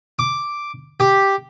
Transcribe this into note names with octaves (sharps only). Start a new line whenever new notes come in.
D6
G4